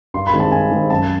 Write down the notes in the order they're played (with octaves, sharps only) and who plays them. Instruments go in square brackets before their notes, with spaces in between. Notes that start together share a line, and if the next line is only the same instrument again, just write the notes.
[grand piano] G2 C6
B5
D#3 G#3 C4
A5
G2 G#5
D#3 G#3 C4
F#2 A5